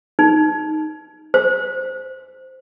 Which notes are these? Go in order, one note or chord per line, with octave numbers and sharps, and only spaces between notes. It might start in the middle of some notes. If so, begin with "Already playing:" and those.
D#4
C5